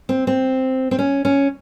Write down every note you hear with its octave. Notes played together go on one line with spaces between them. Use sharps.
C4
C4
C4
C#4
C#4